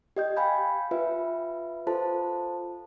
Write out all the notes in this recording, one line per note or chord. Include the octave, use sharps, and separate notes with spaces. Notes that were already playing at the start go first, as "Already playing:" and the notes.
G4 D#5 G6
F5 G5 G#5 B5 G6
F4 B4 E5
F4 A4 C5 A5